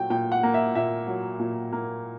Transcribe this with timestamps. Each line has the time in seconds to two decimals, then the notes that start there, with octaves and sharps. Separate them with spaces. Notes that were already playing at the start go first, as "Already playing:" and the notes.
Already playing: A#2 F#3 G5
0.10 A#2 G5
0.32 F#5
0.43 A#3
0.54 E5
0.75 A#2 E5
1.07 F#3
1.39 A#2
1.73 A#3